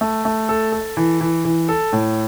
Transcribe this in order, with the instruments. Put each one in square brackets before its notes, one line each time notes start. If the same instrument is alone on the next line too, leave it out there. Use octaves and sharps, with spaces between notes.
[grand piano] A3
A3
A4
A4
E3
E3
E3
A4
A2